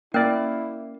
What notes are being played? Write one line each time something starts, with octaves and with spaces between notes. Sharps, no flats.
A#3 C#4 E4 A#4 D5